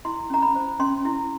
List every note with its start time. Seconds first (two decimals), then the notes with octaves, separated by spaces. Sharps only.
0.05 E4 C6
0.30 C#4 A#5
0.42 B5
0.55 C5
0.80 C#4 C6
1.05 E4